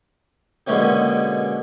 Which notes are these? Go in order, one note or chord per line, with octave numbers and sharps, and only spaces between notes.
B2 D3 G#3 A#3 C#4 G4